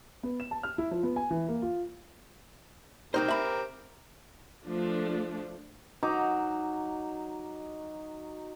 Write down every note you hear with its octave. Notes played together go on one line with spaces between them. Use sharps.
B3
E7
A5
F6
E4
F3
B3
G#5
E3
A#3
F4
C2 C4 D#4 G4 A#4 C5
E5 B5
F3 A3 D4
F#3 D#4 D6